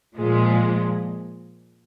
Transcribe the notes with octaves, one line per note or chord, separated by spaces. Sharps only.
A#2 F3 G#3